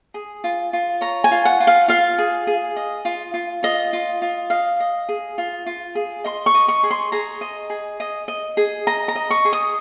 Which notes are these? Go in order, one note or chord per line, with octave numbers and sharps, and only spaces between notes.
G#4
F4
F4
C#5 A#5
G#5
F4
F#5
F4
F5
F4 F5
G#4
G#4
D#5
F4
F4
F4 D#5
F4
F4
D#5 F5
D#5
G#4
F4
F4
G#4
D#5 C6
C#6
D#5
C#6
G#4
C6
G#4 A#5
D#5
G#4
D#5
D#5
G#4
D#5 A#5
A#5
D#5
C#6
G#4
D#6